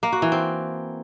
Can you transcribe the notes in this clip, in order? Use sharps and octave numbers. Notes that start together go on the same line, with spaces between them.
A#3
F#4
E3
C4